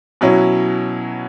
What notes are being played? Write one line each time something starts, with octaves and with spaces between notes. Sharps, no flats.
B2 F#3 C#4 E4